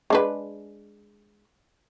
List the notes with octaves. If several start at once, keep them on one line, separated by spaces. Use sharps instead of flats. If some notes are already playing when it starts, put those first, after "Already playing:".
G#3 D4 B4